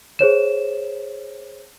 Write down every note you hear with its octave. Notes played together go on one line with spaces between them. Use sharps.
G#4 C5 C#5 E7